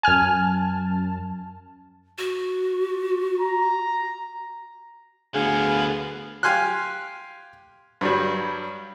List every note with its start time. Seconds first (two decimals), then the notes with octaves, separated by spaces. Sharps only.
0.03 F#2 G#5 A5 F6
2.18 F#4
3.41 A#5
5.35 D2 D3 B3 G#4 F5 G#5
6.43 G4 F5 G#5 C6 F6 F#6
8.01 G2 F#3 G3